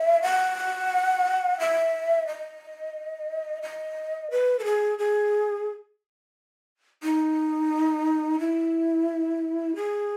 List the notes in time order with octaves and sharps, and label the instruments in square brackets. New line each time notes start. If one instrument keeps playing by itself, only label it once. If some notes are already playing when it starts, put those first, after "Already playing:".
Already playing: [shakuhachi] E5
F#5
E5
D#5
D#5
B4
A4
G#4
G#4
D#4
E4
G#4